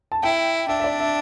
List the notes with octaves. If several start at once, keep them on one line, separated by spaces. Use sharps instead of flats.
A5
E4 G5
D4 E5
E5
D5
E5